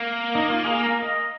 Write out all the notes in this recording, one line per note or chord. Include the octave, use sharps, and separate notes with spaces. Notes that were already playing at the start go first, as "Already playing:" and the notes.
Already playing: A#3
D#4
F4
G#4
A#4
D#5